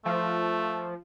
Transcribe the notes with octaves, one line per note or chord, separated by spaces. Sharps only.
F3 A3